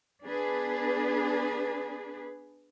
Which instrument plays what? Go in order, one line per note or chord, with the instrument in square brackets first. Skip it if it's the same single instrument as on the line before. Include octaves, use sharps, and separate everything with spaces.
[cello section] B3 D4 G#4 B4